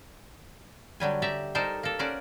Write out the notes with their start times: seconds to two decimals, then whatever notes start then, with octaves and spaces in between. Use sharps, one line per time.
1.00 D3 F#3 G3 G#5
1.22 G4 D5 E5 A#5
1.55 G3 D#4 A4 A#4 C5
1.83 A#3 A4
1.99 C#4 A#4 C5 D5 F#5